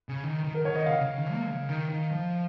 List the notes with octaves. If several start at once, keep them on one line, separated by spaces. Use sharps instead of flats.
C#3
D#3
D#3
A#4
D#3 C#5
D#5
C#3 F5
C#3
D#3
A#3
C#3
D#3
D#3
F3